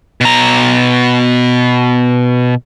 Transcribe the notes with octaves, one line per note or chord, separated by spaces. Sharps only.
B2 A#5